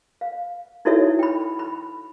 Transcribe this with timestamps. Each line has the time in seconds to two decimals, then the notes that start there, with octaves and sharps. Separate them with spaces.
0.21 F5
0.85 D#4 E4 F#4 A4 C#5 E5
1.19 G5 B5
1.59 B5